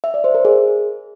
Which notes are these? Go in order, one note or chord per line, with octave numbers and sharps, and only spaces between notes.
E5
D5
C5
A#4
G#4